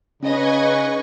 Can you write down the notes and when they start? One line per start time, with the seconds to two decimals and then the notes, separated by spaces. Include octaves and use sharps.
0.23 C#3 C#4 D#4 B4 D#5 G#5 C#6